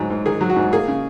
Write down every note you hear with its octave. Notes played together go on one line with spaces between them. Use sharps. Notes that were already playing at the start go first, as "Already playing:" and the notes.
Already playing: G#2 F#3
G#2
D#3 G#4
F#3
F#4
G#2
A#3 G#4
C#3